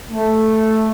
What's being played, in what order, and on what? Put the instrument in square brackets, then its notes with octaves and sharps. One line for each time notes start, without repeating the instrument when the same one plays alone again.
[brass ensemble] A3